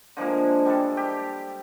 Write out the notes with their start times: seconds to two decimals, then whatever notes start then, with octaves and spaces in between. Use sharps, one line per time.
0.17 D3 F3 G#3 A#3
0.66 G3 G#3 A4
0.97 G4